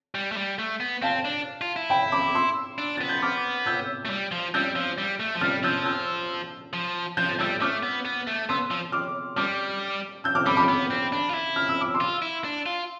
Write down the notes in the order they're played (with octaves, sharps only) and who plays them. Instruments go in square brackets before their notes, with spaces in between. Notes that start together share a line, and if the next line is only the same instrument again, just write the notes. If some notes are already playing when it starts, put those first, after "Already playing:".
[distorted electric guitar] G3
A3
G3
A3
B3
[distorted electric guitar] C4 [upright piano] F5 A5
[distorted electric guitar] D4
F4
E4
[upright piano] G5 B5
B5 D6
C6 E6
[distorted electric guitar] D4
[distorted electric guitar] B3 [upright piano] A6
[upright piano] G6
D6 F6
E6 G6
[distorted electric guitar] A3
G3
F3
[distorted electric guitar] G3 [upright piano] E6 G6
[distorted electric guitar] F3
G3
A3
F3
[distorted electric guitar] G3 [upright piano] F6 A6
[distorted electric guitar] F3 [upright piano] E6 G6
[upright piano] E6 G6
[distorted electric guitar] F3
[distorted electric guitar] F3 [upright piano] G6
[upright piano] A6
[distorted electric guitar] G3 [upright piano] E6 G6
[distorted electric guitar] A3 [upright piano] D6 F6
[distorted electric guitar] B3
B3
A3
[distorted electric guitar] B3 [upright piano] C6 E6
[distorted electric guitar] F3
[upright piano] D6 F6
[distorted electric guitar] G3 [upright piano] D6 F6
[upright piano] E6 G6
D6 F6
[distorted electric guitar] G3 [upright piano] B5 D6
[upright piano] B5 D6
[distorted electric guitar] B3
C4
D4
F4
E4
[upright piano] F6
E6
D6
C6 E6
[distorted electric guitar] F4
E4
D4
F4